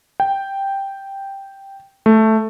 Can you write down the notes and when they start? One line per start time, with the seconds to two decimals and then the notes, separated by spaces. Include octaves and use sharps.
0.20 G5
2.06 A3